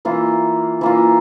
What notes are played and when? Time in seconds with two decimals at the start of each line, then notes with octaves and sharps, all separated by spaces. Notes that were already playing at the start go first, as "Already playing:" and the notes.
0.05 E3 A#3 F4
0.81 E3 A#3 F4